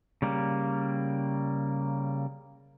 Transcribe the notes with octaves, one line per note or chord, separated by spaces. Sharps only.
C#3 G3 A#3